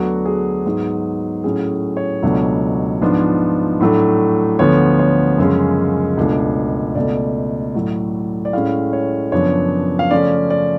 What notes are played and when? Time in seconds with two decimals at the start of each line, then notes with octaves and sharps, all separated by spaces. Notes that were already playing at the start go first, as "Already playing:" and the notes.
Already playing: D2 D3 F#3 B3 D4 F#4
0.26 G#4
0.65 G#2 F#3 B3
1.44 A2 F#3 C#4 G#4
1.97 C#5
2.22 C#2 B2 F#3 A3 D4
3.02 G#2 F3 B3 D4
3.80 A2 F#3 A3 D4
4.59 D2 D3 F3 B3 C#5
4.99 C#5
5.38 F#2 C#3 F3 G#3 C#4
6.17 C#2 B2 A3 D4
6.95 C#2 B2 A3 D5
7.75 A2 F#3 A3
8.45 D5
8.53 A2 G#3 C#4 F5
8.93 C#5
9.32 F#2 C#3 F3 B3 D4 C#5
9.99 F5
10.11 C#3 F3 A3 C#4 D5
10.50 D5